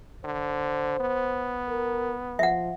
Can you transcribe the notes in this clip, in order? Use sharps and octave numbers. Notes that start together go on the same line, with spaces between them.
D3 C5
B3
A#4
F3 E5 F#5